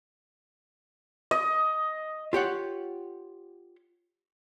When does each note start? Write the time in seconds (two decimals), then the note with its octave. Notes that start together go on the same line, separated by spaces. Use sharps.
1.31 D#5
2.33 F4 G4 C#5 F#5